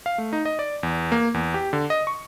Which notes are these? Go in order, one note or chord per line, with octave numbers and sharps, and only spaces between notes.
F5
A3
D#4
D#5
D5
E2
A#3
E2
G4
D3
D#5
C#6